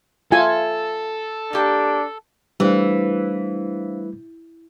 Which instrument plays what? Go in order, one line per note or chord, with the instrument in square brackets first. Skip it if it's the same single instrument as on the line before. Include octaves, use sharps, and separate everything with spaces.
[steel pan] F4 G#5 [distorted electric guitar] A4 [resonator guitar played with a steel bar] E5
[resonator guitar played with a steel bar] A#3 G4 [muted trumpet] D4
[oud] E3 [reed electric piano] G3 A3 [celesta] D4 C5 F5